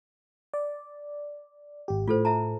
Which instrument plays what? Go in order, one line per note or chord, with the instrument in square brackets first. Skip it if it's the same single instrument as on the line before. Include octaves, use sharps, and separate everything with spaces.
[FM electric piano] D5
G#1 G4
[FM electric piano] A2 [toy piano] F4 A4 C5
[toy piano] E5 A5 A#5